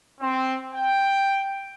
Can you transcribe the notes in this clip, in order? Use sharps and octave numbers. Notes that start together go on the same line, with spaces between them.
C4
G5